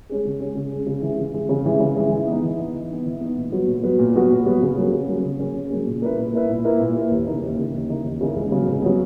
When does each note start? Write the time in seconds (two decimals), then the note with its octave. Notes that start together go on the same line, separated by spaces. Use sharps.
0.10 G#3 C#4 G#4
0.25 C#3
0.40 G#3 C#4 G#4
0.55 C#3
0.72 G#3 C#4 G#4
0.87 C#3
1.02 E3 G#3
1.18 C#3
1.34 E3 G#3
1.49 C#3
1.66 E3 G#3
1.80 C#3
1.96 E3 G#3
2.12 E3
2.27 B3 D#4
2.43 E3
2.59 B3 D#4
2.75 E3
2.90 B3 D#4
3.06 E3
3.21 B3 D#4
3.36 A#2
3.52 F#3 B3 F#4 B4
3.67 A#2
3.83 F#3 B3 F#4 B4
3.99 A#2
4.15 F#3 B3 F#4 B4
4.30 A#2
4.46 F#3 B3 F#4 B4
4.61 C#3
4.77 F#3 A#3 C#4 G#4
4.92 C#3
5.08 F#3 A#3 C#4 G#4
5.24 C#3
5.39 F#3 A#3 C#4 G#4
5.55 C#3
5.70 F#3 A#3 C#4 G#4
5.86 A#2
6.02 A#3 E4 B4
6.18 A#2
6.33 A#3 E4 B4
6.49 A#2
6.65 A#3 E4 B4
6.80 A#2
6.96 A#3 E4 B4
7.11 D#2
7.27 C#3 E3 A#3 D#4
7.42 D#2
7.58 C#3 E3 A#3 D#4
7.74 D#2
7.89 C#3 E3 A#3 D#4
8.04 D#2
8.21 C#3 E3 A#3 D#4
8.36 C#2
8.51 C#3 F#3 B3
8.68 C#2
8.82 C#3 F#3 B3